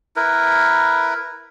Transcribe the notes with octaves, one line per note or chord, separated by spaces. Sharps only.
E4 A#4 B4